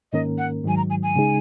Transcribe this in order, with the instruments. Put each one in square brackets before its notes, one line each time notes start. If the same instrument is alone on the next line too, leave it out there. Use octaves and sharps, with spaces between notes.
[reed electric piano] G#2 D#3 A#3 C#4 A#4 [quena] D#5
[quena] F#5
[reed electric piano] G#2 D#3 F#3 [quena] G#5
[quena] A#5
G#5
G#5
[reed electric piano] C#3 G#3 D#4 G#4